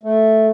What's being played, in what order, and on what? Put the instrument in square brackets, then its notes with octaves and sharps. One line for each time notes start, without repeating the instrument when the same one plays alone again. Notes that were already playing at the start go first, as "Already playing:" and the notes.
[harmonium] A3